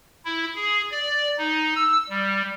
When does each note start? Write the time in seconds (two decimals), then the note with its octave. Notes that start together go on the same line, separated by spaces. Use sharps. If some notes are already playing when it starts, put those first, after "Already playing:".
0.25 E4
0.55 G#4
0.91 D5
1.38 D#4
1.75 E6
2.09 G3